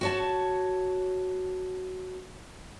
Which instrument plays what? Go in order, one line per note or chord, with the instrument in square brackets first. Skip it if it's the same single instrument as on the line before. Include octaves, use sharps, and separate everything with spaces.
[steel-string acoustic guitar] F#4 C#5 A5